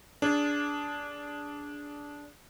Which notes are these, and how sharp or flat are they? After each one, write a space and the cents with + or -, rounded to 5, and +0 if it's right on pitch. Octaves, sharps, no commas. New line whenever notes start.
D4 -15 G#4 +0